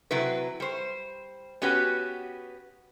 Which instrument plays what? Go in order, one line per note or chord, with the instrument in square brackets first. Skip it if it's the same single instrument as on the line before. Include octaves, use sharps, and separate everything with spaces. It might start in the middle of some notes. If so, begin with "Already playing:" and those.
[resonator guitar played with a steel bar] C3 F#3 E4 B4
G3 C5
B3 C#4 F#4 G4 B4